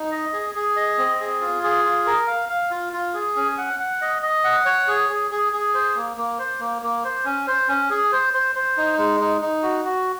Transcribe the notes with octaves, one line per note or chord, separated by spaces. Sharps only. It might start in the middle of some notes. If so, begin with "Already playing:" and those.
Already playing: D#4
D#5
G#4
G#4
D#5
C4
G#4
F4
G#4
F4
A#4
F5
F5
F4
F4
G#4
C#4
F#5
F#5
D#5
D#5
F#5
C#5
G#4
G#4
G#4
G#4
C5
A#3
A#3
C5
A#3
A#3
C5
C#4
C5
C#4
G#4
C5
C5
C5
D#4
G#3
D#4
D#4
F#4
F#4